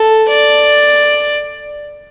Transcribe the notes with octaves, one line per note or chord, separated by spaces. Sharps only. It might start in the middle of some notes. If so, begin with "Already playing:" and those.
Already playing: A4
D5